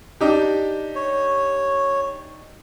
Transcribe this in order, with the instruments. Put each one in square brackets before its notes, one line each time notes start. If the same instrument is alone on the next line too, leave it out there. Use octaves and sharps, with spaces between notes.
[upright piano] D4 D#4 G4
[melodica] C#5